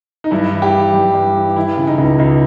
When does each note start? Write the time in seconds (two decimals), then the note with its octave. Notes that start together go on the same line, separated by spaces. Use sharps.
0.24 D#4
0.31 G2 E4
0.53 E3
0.62 G4
0.74 E3
0.94 G2
1.14 G2
1.36 E3
1.56 E3 E4
1.77 C#3
1.87 D#4
1.98 C#2
2.18 C#2 D#4